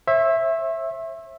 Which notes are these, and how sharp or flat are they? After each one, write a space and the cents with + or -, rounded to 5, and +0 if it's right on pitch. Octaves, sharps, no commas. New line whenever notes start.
C#5 -45 E5 +0